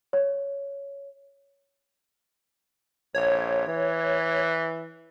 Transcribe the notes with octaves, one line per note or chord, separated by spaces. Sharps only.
C#5
A#1 C#5
E3